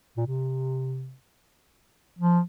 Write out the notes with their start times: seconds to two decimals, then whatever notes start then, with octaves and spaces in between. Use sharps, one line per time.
0.17 A#2
0.27 C3
2.19 F3